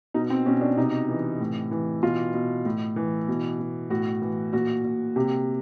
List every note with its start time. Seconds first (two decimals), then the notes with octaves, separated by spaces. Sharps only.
0.14 B2 D#4
0.30 C4
0.46 B2 C#4
0.61 D4
0.77 C3 D#4
1.09 E3
1.40 A2
1.71 E3
2.03 B2 F4
2.34 B2
2.65 A2
2.96 E3
3.28 B2
3.59 B2
3.90 A2 F#4
4.22 E3
4.53 A#2 F#4
4.84 A#2
5.16 C3 G4